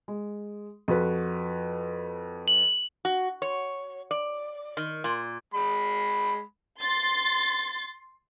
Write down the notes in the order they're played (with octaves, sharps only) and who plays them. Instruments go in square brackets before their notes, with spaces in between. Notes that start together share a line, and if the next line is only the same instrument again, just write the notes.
[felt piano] G#3
F2 F#4 B4
[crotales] F#7
[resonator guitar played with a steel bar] F#4
C#5
D5
D#3
A#2
[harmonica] G#3 B5
[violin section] C6 A6